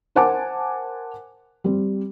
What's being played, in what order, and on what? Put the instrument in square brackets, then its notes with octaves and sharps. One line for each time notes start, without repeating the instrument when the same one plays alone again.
[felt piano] A#4 C5 F#5 G#5 A5 D6
G3 C4